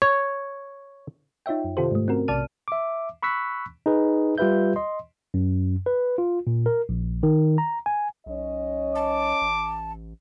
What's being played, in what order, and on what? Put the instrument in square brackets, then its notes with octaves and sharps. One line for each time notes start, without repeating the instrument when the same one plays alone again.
[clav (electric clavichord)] C#5
[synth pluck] D#4 F4 C#5 E5 G5
F#2
C3 D#3 F4 G4 A4 C5
G#2 A3
C4 C#4 F#4 A#4
B1 C3 D5 A5 F6 D#7
[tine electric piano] E5 D6
B5 C#6 E6 F#6 B6
D#4 G#4 B4
G3 F4 G4 B4 E5 G6
D#5 C6
F#2
B4
F4
A#2
A#4
A#1
D#3
A#5
G#5
[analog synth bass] B1 [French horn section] C#4 C#5 D#5
[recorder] A5 [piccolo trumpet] D6
[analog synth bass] A1